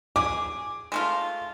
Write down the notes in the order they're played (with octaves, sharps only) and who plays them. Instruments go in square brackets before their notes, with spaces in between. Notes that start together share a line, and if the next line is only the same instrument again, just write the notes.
[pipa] G#4 [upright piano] D6
[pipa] G#3 A3 F4